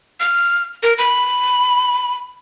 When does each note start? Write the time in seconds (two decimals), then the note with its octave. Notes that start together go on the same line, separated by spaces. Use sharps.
0.20 F6
0.83 A#4
0.98 B5